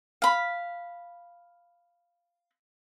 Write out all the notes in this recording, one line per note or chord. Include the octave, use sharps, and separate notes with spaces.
F5 B5